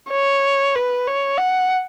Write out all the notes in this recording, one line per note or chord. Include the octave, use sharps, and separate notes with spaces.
C#5
B4
C#5
F#5